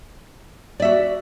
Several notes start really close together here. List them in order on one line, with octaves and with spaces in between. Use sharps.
D5 E5 F#4